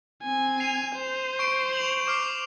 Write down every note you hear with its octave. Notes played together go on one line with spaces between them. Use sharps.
C4 G#5
C7 D#7 F7
C5
C#6 D7
F7 F#7
D6 F6 C7